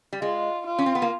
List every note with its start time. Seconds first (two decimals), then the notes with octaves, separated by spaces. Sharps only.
0.13 G3
0.22 G#3 F4
0.66 F4
0.79 C#4
0.86 C4
0.95 B3
1.02 A#3